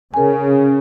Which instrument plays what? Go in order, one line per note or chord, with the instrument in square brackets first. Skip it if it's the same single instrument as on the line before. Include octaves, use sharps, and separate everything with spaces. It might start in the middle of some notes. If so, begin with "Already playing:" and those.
[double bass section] C#3 [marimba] A#4 G#5